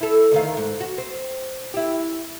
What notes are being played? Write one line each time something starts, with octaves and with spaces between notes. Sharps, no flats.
E4 A4
D2 D#3 F5
G#2
F#4
C4
E4 G4